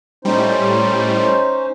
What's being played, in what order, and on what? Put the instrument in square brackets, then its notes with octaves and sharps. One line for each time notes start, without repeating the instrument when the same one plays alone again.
[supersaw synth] A2 G3 [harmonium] C#4 D#4 C5